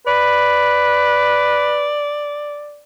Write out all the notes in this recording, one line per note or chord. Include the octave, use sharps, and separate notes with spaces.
B4 D5